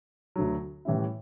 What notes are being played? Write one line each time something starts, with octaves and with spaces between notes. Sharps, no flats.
D2 D3 F#3
A2 E3 G3 C#4 E4